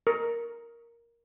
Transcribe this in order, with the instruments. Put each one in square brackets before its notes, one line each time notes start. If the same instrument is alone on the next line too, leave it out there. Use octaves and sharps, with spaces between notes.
[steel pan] A#4